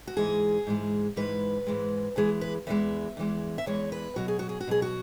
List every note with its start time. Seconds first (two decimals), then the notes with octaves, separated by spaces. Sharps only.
0.07 F#4
0.17 G#2 E3 G#3 G#4
0.67 G#2 E3 G#3
1.16 G#2 E3 G#3 B4
1.67 G#2 E3 G#3
2.16 E2 E3 G#3 G#4
2.41 B4
2.67 E2 E3 G#3 E5
3.17 E2 E3 G#3
3.58 E5
3.66 E2 E3 G#3 C#5
3.92 B4
4.16 B2 F#3 F#4
4.28 G#4
4.39 F#4
4.49 G#4
4.60 F#4
4.67 B2 F#3 G#4
4.82 F#4